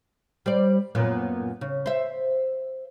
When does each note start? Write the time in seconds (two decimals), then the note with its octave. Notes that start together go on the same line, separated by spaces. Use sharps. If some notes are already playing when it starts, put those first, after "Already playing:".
0.46 G3 C5 D5
0.95 F#2 A#2 B3
1.61 C#3
1.86 C5 E5